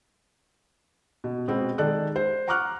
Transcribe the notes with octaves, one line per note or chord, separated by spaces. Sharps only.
B2
B2 G#3 B3 C4
D#3 G#3 A4 D5 F#6
C5
F#5 A#5 C#6 D6 F6 F#6